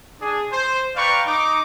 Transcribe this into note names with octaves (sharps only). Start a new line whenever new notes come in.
D4 G#4
C5
B4 D5 F5 G5 A#5 C#6
D#4 D6